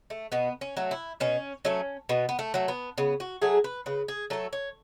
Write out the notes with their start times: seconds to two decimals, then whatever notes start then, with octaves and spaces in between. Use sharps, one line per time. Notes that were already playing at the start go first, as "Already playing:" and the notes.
0.10 A3
0.32 B2 B3
0.61 C#4
0.77 F#3 A3
0.91 E4
1.20 B2 C#4
1.65 F#3 A3 C#4
2.09 B2 B3
2.29 B3
2.39 A3
2.54 F#3 A3
2.68 B3
2.98 C#3 B3
3.20 F#4
3.42 F#3 A3 G#4
3.64 B4
3.86 C#3 B4
4.08 G#4
4.30 F#3 A3 A4
4.53 C#5